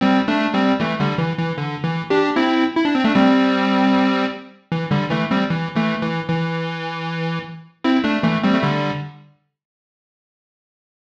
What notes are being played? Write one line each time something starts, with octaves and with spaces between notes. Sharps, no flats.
G3 C4
A3 D4
G3 C4
E3 A3
D3 G3
E3
E3
D3
E3
D4 G4
C4 E4
E4
D4
C4
A3 D4
G3 C4
E3
D3 G3
E3 A3
G3 C4
E3
E3 A3
E3
E3
C4 E4
A3 D4
E3 A3
G3 C4
A3
D3 G3